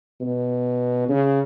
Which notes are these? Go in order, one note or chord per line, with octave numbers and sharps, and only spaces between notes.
B2
C#3